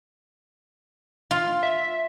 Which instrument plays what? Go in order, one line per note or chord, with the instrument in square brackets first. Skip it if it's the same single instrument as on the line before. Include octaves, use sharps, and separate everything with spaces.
[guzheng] F4
[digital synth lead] E5